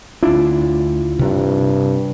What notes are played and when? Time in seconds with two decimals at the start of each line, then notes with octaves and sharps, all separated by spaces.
0.23 D2 D4 E4 F4
1.19 G2 C3